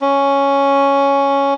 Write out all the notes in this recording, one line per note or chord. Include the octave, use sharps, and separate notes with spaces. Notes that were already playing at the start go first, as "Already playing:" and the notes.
C#4